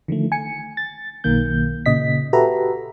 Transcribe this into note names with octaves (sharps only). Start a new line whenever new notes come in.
D3 D#3 F3 A3
G#5 C#7
A6
B1 D#3 A#3 G6
A#2 C#3 D#5 B6
F#4 G4 A4 B4 E5 A#5